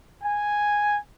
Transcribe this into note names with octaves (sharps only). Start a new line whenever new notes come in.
G#5